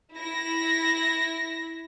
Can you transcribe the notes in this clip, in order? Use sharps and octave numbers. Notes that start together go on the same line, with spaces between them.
E4 A#6